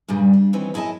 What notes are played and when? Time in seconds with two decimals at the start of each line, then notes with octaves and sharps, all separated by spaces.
0.08 G2 A#2 C#3 G3
0.33 D4
0.53 D#3 E3 C4 C#4
0.74 F#2 E4 G#4 D#5 G#5 A5